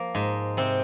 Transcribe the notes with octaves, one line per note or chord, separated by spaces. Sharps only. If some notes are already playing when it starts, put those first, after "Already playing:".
Already playing: F3 A#3
G#2
C3 C4